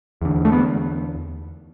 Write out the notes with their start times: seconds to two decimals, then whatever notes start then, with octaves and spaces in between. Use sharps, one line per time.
0.22 E2 D3
0.45 A3
0.52 B3